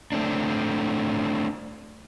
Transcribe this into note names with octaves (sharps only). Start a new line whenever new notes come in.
A3 C4 D4